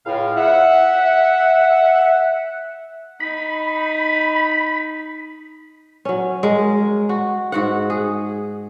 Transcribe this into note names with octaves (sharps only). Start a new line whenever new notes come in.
C#2 A2 F5
E5 F#5
D#4 B5
F#3 C#4
G#3 A#4
F#4
G#2 F#4 F#5
G#4